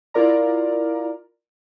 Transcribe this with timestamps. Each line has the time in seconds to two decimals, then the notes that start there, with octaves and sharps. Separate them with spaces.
0.14 E4 F4 A#4 D5 A#5